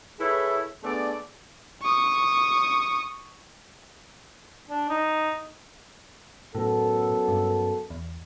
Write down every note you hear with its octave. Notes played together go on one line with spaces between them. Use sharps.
E4 G#4 A4 B4 C#5 E5
A3 B3 D4 G#4 A4 D5
C#6 D#6
D4
D#4
F#2 A2 B3 A4
G2
E2